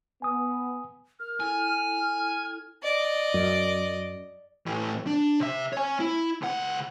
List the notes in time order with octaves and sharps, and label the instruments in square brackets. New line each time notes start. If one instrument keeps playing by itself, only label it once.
[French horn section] B3 [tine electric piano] G#5 D#6
[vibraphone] A#4 [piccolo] F6
[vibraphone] E4 A4 [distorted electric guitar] G#5
[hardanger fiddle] D5 D#5
[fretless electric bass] F#2
[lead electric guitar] A2 E3
D4
C3 E5
C#5 G#5
E4
C#2 F#5